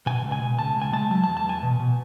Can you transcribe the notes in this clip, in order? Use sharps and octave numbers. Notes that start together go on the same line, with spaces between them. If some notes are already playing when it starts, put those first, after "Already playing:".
B2 G#5
C#2
G#5
B2
C#2 A5
C#2
G#5
G#3 A5
F#3 A5
A5
E2
A5
E2 G#5
B2
B2